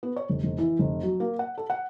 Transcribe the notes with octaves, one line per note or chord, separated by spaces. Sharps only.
B3
C#5
F1
F1
E3
F1
F#3
A#3
F#5
A4
F#5